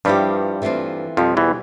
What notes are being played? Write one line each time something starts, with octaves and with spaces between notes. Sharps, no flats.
G2 F3 G3 B3 E4 G4
E3 A3 C4 F4
F2 B2 F3 G3 C4
E2 E3